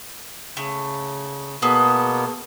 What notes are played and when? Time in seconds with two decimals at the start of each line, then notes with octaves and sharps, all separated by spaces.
0.57 C#3 A3
1.62 B2 A#3 B3 G#4 A4 B4